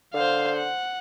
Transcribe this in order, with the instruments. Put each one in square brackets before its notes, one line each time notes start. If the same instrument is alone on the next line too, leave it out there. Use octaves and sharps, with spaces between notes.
[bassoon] D3 [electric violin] C5 F5
[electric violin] F#5